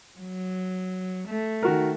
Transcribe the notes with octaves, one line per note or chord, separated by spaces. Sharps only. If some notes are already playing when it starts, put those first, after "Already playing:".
F#3
A3
D#3 F#4 A#4